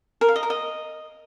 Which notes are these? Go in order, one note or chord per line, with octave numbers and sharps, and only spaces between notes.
A#4
F5
D#5
A#4
D#5